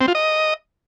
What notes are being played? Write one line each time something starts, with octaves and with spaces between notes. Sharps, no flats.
C4
F4
D#5